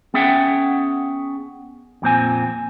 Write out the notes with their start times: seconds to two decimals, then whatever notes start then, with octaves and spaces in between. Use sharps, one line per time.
0.14 B3 C#4 G#4 E5 F#5 G5
2.02 F2 A#2 C4 G#5